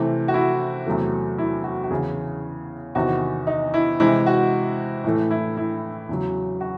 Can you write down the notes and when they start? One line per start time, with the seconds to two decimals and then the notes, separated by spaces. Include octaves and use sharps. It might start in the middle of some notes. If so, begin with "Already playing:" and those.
Already playing: C3 E3 A3
0.28 F#4
0.34 E4
0.86 E2 C3 F#3 A3
1.38 E4
1.64 F#4
1.84 F#4
1.90 E2 C#3 E3 G#4
2.95 E2 C3 D#3 F#4
3.47 D#4
3.74 E4
4.00 C3 E3 G#3 E4
4.26 F#4
5.04 A2 E3 A3
5.31 E4
5.57 E4
6.09 E2 C#3 F#3
6.61 F#4